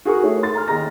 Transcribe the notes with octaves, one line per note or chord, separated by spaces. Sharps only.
F#4 G#4 A#4 C#6
A3 E4 G#4 C#5
C6 A6
A#5 F6
D#2 D#4 G#4 A#5 A#6